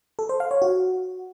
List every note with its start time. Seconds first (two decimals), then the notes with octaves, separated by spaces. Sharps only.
0.19 A4
0.29 C5
0.40 F5
0.51 C#5
0.62 F#4